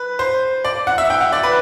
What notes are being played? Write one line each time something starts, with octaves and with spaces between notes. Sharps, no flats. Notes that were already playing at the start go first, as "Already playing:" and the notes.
Already playing: B4
C5
D5
F#5
E5
G5
F#5
D5
B4